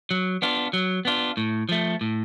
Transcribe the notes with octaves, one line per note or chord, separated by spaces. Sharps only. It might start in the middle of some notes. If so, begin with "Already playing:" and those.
F#3
B3 D4 F4
F#3
B3 D4 F4
A2
F3 A3
A2